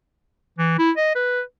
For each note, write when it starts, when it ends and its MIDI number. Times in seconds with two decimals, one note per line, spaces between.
0.58 0.78 52
0.79 0.91 64
0.97 1.13 75
1.15 1.41 71